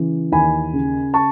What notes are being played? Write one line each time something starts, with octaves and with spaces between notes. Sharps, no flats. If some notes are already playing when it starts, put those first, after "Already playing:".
Already playing: C#3 E3
D#2 G#5 B5
C#3
A5 C#6